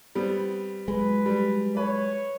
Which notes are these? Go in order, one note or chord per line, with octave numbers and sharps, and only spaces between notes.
G3 B3 C4
F#3 G#3 B4
G3
B4 C#5